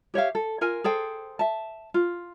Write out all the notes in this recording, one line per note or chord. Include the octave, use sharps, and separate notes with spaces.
G4 C#5 E5 F5
A4
F4 A#4 G#5
G#4 A4 C5 G5
E5 A5
F4